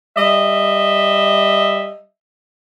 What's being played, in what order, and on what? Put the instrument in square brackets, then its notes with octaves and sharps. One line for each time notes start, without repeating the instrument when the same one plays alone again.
[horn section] G3 D#5 E5